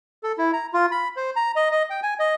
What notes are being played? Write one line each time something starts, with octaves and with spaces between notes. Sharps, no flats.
A4
E4
A#5
F4
B5
C5
A#5
D#5
D#5
G5
G#5
D#5